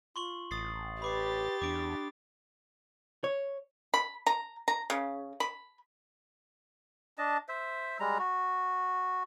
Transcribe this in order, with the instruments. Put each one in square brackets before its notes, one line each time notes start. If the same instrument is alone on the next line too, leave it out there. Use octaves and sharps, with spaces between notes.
[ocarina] F4 [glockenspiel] C6 C#6 F#7
[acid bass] A1 [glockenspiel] D#6 A6 C7
[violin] G4 A6 [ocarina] B4 [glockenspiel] B5 D6 C7
[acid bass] E2 [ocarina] D4 [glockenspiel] D6 D7
[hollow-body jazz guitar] C#5
[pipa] B5
A#5
A#5
C#3
B5
[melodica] D4 D#5 A5
C5 E5
G3 G#3 A#5
F#4